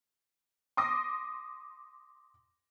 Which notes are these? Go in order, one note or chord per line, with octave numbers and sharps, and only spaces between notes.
C6 D6 D#6 A#6